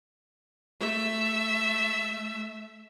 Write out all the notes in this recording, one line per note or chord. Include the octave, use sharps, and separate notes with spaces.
A3 E5